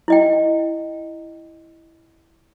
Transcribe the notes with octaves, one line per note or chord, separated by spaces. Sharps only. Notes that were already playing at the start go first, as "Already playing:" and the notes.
E4 D#5 G5